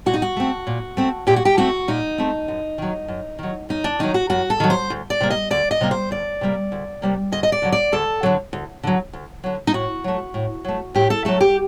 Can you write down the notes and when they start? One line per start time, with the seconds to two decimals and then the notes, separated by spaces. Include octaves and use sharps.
0.06 A#2 F#4
0.14 D#4
0.22 F#4
0.36 A3 C4
0.67 A#2
0.97 A3 C4
1.27 A#2 G4
1.36 F#4
1.45 G4
1.57 A3 C4 F#4
1.88 A#2 D#4
2.18 A3 C4
2.48 F#2
2.78 D#3 F#3
3.08 F#2
3.39 D#3 F#3
3.69 F#2 D#4
3.84 D4
3.99 D#3 F#3 D#4
4.14 F#4
4.30 F#2 F#4
4.50 A4
4.60 D#3 F#3
4.70 C5
4.90 D2
5.10 D5
5.20 C3 G3 A#3
5.30 D#5
5.50 D2 D5
5.71 D#5
5.81 C3 G3 A#3
5.91 C5
6.11 D2 D5
6.41 C3 G3 A#3
6.72 D2
7.02 C3 G3 A#3
7.32 D2 D#5
7.43 D#5
7.52 D5
7.62 D3 F#3
7.72 D5
7.92 D2 A4
8.23 D3 F#3
8.53 D2
8.83 D3 F#3
9.13 D2
9.44 D3 F#3
9.67 D#4
9.74 A2 F#4
10.04 F#3 A3
10.34 A2
10.65 F#3 A3
10.95 A2 G4
11.10 A4
11.25 F#3 A3 A4
11.41 G4